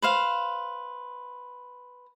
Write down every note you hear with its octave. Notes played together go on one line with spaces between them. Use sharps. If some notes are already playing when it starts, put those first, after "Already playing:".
B4 C5 F5